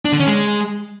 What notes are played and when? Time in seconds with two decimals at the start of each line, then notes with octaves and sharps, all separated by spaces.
0.05 D4
0.12 D3
0.20 C#4
0.27 G#3